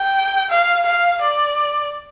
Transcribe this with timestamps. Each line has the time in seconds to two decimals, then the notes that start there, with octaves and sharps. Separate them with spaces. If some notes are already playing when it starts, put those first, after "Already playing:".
Already playing: G5
0.50 F5
0.86 F5
1.21 D5